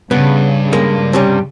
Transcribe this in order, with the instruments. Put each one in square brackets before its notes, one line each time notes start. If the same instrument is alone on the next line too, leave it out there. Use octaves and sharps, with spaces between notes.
[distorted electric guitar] G2 [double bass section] C#3 [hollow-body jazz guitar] B3
[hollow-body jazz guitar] G#3 A#3
C3 G3 C#4